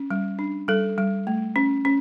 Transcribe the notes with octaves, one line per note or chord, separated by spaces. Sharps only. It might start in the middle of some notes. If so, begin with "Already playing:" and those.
Already playing: C#4
G3
D4
G3 A4
G3
A3
C#4
C#4